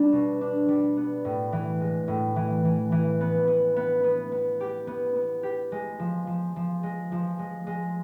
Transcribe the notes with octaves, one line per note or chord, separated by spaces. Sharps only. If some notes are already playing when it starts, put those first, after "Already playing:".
Already playing: G3 D4
B2
D4
G3
B3
A2
E3
G#3
A2
E3
E3
E3
B3
B3
B3
B3
B3
G4
B3
B3
G4
G#3
F3
F3
F3
G#3
F3
G#3
G#3